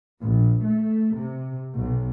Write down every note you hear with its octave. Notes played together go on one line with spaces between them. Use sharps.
A#1
A3
C3
B1